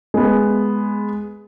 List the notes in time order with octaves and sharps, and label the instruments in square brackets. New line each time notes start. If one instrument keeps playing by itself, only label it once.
[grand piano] G#3 B3